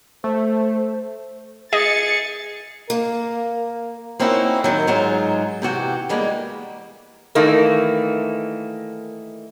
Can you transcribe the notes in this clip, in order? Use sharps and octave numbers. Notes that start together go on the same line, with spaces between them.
A3 C5
G#4 D#5 A6 C#7
A#3 A#4
A#3 C4 C#4 D#4 E4 F#4
F#2 B2 D#3 F#3
G#2 F#3 G#3 D#4 F4
C3 E3 F#4 G4
E3 G3 G#3 A#3 B3
D#3 E3 A3 A#3